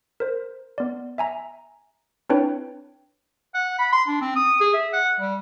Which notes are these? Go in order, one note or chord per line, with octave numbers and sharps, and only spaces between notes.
A#4 C5
B3 D5
E5 G#5 A#5
C4 D4 E4 B4 C#5 G5
F#5
B5
C6
D4
C4
D#6
G#4
E5
F#5
G3